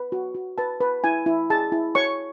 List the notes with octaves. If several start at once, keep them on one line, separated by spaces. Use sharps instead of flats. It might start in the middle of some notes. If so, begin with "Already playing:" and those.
Already playing: B4
F#4
F#4
B4 A5
B4
E4 G#5
E4
G#4 A5
E4
C#5 C#6